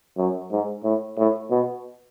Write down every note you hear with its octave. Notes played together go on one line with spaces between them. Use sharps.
F#2
G#2
A2
A2
B2